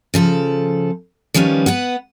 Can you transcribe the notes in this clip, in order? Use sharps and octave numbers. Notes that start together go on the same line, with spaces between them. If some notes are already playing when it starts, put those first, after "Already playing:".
C#3 F3 A4
D#3 F3 G3 C#4 B4
B3 B4 F#5